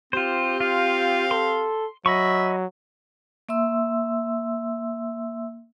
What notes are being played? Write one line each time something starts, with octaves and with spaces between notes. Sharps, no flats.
C4 F4 G4 C5
F4 F5
A4 C6
F#3 D#5 E5 B5 C#6
A#3 E5 C6 E6